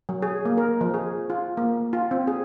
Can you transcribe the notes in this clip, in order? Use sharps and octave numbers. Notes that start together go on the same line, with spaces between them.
F#3
G#4
A#3
A#4
F3
G#4
F4
A#3
F4
C4
G#4